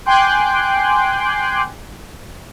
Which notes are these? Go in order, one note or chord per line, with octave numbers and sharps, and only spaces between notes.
G5 G#5 C6 D6 F#6 G6